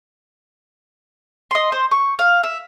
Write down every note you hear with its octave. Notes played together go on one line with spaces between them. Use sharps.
D#5 C6
C5
C#6
F5
E5